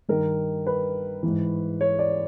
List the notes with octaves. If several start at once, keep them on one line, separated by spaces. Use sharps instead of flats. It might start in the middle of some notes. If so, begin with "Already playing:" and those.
G2 D#3 A#4
B4
G#2 E3
C#5
D5